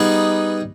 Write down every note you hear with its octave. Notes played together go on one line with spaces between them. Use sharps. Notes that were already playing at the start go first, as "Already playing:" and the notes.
Already playing: G3 B3 D#4 G#4